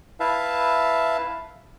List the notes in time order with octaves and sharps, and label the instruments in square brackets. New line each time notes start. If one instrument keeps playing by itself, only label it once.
[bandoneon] E4 B4 E5 F5 A5